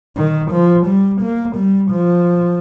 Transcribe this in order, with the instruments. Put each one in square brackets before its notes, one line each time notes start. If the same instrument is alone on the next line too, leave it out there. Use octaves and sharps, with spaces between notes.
[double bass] D#3
F3
G3
A#3
G3
F3